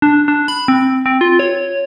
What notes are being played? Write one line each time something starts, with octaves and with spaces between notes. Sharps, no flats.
D4
D4
B5
C4
C4
F4
C#5